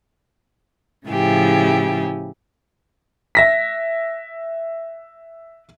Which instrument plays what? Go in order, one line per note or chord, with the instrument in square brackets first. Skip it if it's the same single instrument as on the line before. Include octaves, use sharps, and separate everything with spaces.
[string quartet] A2 C#3 F3 E4 G4 G#4
[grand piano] E5 A#6 B6